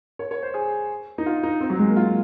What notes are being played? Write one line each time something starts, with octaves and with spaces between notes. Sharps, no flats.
C#5
C#5
C5
G#4
D#4
F4
D#4
C4
F#3
G#3
A#3
F4